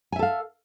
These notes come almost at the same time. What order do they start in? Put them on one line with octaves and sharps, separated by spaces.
G#5 E5 A4 F5